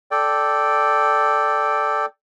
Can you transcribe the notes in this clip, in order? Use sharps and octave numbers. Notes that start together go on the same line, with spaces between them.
A4 D5 G5